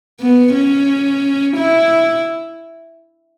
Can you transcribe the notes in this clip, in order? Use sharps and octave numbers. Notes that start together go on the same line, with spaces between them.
B3
C#4
E4